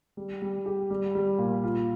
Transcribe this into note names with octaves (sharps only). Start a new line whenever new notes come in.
G3
G3
G4
G3
G3
A#2
F4